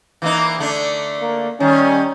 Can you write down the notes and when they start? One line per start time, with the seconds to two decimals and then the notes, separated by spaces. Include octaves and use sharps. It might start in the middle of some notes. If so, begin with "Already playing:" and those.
0.22 E3 A#3 D#4
0.58 D3 A3 D4
1.19 A#3
1.60 D#3 G3 C#4